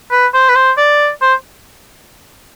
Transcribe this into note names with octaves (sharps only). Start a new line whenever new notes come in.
B4
C5
B4
C5
D5
C5